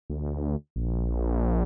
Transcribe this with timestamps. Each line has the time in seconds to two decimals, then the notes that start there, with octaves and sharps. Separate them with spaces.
0.10 D2
0.76 A#1